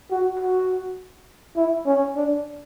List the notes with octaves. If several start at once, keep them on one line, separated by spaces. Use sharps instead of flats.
F#4
F#4
E4
C#4
D4